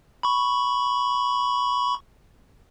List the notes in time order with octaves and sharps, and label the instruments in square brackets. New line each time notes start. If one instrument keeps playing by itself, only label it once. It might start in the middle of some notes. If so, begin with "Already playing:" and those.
[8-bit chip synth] B5 C#6